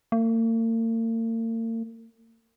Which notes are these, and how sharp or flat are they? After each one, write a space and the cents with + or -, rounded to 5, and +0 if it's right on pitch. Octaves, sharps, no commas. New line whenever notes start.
A#3 -45